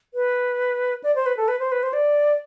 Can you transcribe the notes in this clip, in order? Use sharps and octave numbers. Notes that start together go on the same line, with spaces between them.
B4
D5
C5
B4
A4
B4
C5
B4
C5
D5